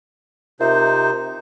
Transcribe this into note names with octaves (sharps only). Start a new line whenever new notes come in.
C3 D#4 F4 A#4 C5 E5